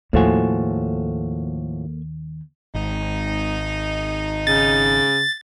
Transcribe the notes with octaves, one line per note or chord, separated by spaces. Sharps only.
D#2 A2 F3 A#3 F#4 A4 G#5
G#1 D#4
C#3 A6